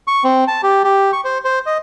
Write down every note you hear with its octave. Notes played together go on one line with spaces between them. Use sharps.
C#6
C4
A5
G4
G4
C#6
C5
C5
D#5